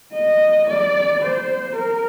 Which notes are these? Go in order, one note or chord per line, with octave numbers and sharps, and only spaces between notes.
D#5
D5
C5
A#4